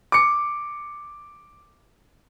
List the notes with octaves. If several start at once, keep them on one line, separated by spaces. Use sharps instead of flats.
D6 C#7